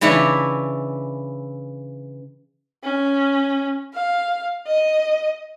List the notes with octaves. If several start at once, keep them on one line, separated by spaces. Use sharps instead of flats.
C#3 E3 D4 E4 C#5
C#4
F5
D#5